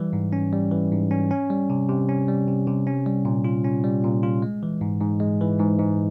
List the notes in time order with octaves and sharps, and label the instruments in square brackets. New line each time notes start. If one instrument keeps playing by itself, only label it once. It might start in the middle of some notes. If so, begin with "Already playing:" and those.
Already playing: [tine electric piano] E3 G3
G#2
C#4
G3
E3
G#2
C#4
C#4
G3
C3
C3
C#4
G3
C3
C3
C#4
G3
A#2
F4
C#4
G3
A#2
F4
G#3
E3
G#2
G#2
G#3
E3
G#2
G#2